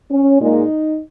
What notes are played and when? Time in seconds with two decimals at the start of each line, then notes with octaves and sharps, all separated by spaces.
0.11 C#4
0.41 A#2 G#3 D#4